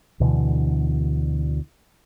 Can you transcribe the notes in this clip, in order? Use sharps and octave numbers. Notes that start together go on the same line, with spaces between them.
D2 B2 D3 E3